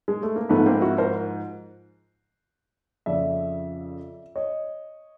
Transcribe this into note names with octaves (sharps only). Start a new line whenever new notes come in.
G#3
A3
A#3
G#2 F3 A3 B3
A#3 C4
E4 F#4
A#4 C5
F2 C#3 F3 D5 E5
C#5 D#5